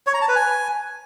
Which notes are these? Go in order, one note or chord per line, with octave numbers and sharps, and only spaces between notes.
C#5
A#5
A5
B4
G#5